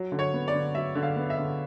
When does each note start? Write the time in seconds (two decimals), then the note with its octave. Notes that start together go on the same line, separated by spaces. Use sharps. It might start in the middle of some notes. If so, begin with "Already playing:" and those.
Already playing: F#3
0.12 D3
0.19 C#5
0.34 B3
0.48 D5
0.54 D3
0.75 F#3 E5
0.95 D3
1.03 F5
1.16 B3
1.30 E5
1.38 D3